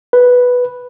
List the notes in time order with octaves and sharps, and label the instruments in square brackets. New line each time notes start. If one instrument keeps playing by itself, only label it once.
[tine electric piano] B4